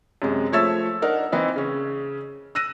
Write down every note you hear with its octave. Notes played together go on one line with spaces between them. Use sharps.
F#2 C3 G#3
F3 A3 C#5 E5 E6 A6
D4 D#4 A#4 F#5
E3 C4 D#4 E4
C#3 C#4
E6 F#6 A#6 D#7